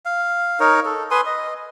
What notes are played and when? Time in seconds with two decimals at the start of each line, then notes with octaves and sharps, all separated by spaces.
0.05 F5
0.60 D#4 A#4 C#5
0.85 A4
1.11 B4 G#5 C6 D#6
1.26 D#5